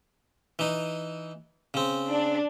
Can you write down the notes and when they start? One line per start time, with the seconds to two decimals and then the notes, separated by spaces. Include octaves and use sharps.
0.59 E3 D#4
1.74 C#3 C4
2.10 D4